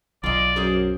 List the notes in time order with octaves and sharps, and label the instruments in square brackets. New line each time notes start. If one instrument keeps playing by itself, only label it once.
[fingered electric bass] B1 [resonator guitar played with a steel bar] F4 D#5 [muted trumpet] D5
[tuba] F#2 [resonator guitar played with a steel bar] G#4 A#4 C5